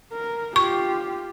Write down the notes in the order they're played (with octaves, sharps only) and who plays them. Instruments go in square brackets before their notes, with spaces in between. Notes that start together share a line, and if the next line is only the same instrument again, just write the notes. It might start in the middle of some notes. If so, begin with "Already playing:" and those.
[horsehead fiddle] A#4
[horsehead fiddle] F4 G4 [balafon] C#6